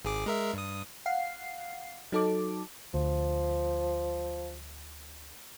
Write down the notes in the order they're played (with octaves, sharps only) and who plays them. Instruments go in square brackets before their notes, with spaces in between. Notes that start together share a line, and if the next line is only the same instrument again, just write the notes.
[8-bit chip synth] G#1 G#4 D6
G#3 A#4 E5
G2 D#6
[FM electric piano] F5 F#5 C7
F#3 D#4 A4 A5 D6
[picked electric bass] D2 [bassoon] F3